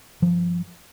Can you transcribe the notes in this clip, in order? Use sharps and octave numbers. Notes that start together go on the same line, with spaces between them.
G2 F3